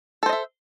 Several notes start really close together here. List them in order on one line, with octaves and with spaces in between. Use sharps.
A4 C5 D#5 E5